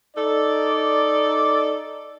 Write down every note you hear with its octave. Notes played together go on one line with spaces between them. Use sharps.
D#4 A4 D5